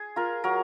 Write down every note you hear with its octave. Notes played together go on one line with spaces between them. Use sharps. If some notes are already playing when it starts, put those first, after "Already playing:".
Already playing: G#4
F4 A#4
F#3 A#4